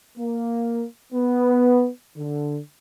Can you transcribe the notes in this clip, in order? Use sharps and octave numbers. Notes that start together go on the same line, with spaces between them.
A#3
B3
D3